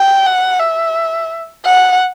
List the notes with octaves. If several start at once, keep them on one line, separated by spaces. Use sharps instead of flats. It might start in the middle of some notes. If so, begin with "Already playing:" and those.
Already playing: G5
F#5
E5
F#5